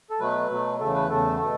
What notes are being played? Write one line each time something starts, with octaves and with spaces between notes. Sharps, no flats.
A4
B2 F#3 A3 B4
B2 F#3 A3
E2 C#3 A3 A4
B4
E2 C#3 A3 A4
B2 A3